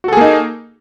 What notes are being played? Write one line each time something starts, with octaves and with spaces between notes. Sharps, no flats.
A#3 D#4 F#4 G#4 A4